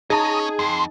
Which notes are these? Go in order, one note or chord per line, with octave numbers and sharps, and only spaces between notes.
C#4 D#4 G#4 C#5 A5 A#5 D#6
F2 C6